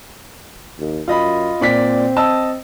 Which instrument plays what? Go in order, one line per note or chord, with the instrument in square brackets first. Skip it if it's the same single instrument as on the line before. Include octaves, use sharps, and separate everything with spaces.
[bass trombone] D#2
[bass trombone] F#2 [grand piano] F4 D#5 B5
[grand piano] A#2 D5 B6 [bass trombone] C4
[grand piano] D#5 A5 E6